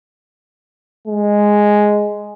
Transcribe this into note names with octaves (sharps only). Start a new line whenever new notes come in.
G#3